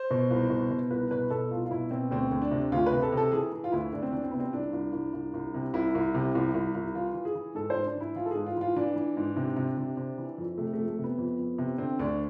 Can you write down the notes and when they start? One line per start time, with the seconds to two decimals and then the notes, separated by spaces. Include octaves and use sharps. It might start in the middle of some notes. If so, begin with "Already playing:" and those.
Already playing: C5
0.11 B2
0.30 C2
0.50 B2
0.70 B2
0.90 C2 B4
1.11 B2 B4
1.30 B2 A4
1.50 C2 F4
1.66 F4
1.71 B2 E4
1.91 B2 C4
2.11 D2 C4
2.31 D2
2.42 D4
2.51 C3
2.72 D2 F4
2.86 B4
2.91 C3
3.03 A4
3.12 C3
3.17 A4
3.32 E3 G#4
3.52 E3
3.64 F4
3.72 D2 E4
3.93 D2 D4
4.03 C4
4.12 E3 D4
4.24 C4
4.31 C3 B3
4.40 C4
4.53 C2 D4
4.73 C2
4.93 C2
5.13 C2
5.34 C2
5.54 C3
5.74 C2 E4
5.95 C2
6.15 C3
6.35 C2
6.54 C2
6.75 C2
6.95 E3 F4
7.15 E3
7.25 G#4
7.35 E3
7.55 G#2 A4
7.70 C5
7.75 G#2
7.86 D4
7.96 E3 E4
8.15 E3 F4
8.26 A4
8.31 G#2 G#4
8.46 F4
8.57 E3 F4
8.76 E3 D4
8.96 E3
9.17 G#2
9.36 C3
9.56 C3
9.77 C3
9.97 C3
10.18 E3
10.38 F2
10.58 C3 A3
10.73 F2 A3
10.88 A3
10.99 C3
11.04 B3
11.18 F2
11.39 F2
11.58 C3
11.78 D3 C4
11.99 D2 D4